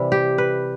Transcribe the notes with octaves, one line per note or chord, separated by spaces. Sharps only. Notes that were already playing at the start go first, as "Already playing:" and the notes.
Already playing: C3 E3 G3 E4
G4
B4